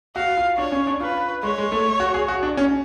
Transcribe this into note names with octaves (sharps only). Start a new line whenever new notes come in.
F#4 F5
F4
D4 C#5
C#4
D4
F4 B4
G#3 C#5
G#3
A3
F#4
G#4
F#4
D4
C#4